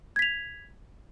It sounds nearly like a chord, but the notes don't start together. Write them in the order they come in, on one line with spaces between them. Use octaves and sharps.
G#6 B6 F7